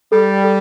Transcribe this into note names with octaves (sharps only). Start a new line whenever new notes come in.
G3 A4
A4